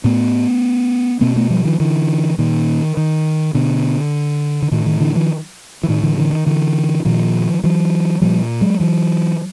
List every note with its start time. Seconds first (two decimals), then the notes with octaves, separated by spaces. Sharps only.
0.04 A2 A3 B3
1.21 B2 A#3 C4
1.36 A3 B3
1.50 F3 G3
1.65 D#3 F3
1.80 D3 E3
2.38 A#2 D#3
2.97 D#3
3.54 B2 D3
4.62 D3
4.71 A2 D#3
4.86 D#3
5.00 D3 E3
5.15 D#3 F3
5.83 E3
5.88 A2 D#3
6.04 D3 E3
6.17 D3 E3
6.33 D#3
6.46 D3 E3
7.05 A#2 D#3 F3
7.64 E3 F#3
8.22 A#2 F3 G3
8.61 F#3 G#3
8.80 E3 F#3